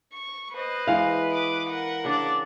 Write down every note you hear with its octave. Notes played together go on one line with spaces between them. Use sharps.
C#6
B4 C5 D#5
E3 G#3 F5
D6 D#6
A#4 F#5
C#3 D4 D5